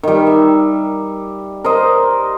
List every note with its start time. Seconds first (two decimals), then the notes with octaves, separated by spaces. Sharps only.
0.03 D#3 G3
0.27 E5
1.64 A#4 C5 D#5